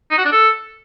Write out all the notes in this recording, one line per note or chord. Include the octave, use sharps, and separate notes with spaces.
D#4
F#4
D4
A4